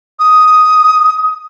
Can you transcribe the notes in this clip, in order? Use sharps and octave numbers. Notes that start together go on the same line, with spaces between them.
D#6